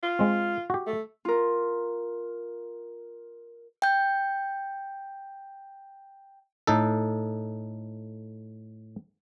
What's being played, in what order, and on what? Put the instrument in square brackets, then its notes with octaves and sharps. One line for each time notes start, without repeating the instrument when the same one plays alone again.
[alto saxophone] F4
[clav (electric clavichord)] G#3 C4
F#4 G4
[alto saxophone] A3
[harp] F4 A#4
[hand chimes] G5 G6
[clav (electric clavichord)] A2 D#4 A4